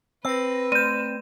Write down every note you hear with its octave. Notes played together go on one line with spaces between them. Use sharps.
C4 B4 E6 A#6
A3 G6 D#7 E7